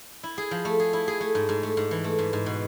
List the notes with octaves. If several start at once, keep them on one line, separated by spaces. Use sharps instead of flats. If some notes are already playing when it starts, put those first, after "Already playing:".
E4
G#4
F3
A3
G#4
E4
G#4
A3
G#2
G#2
A3
G#2
E3
A3
G#2
G#2
B2